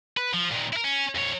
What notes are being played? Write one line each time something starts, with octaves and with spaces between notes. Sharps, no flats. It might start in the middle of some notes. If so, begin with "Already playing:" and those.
B4
F3
A#2 D#3
E4 A#4
C#4
F2 C#5